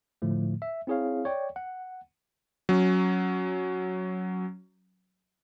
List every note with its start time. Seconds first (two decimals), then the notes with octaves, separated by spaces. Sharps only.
0.22 A2 D3 F3 A3
0.62 E5
0.87 C4 E4 G#4 C#5 F5
1.25 C#5 D5 G5
1.56 F#5
2.69 F#3 C#4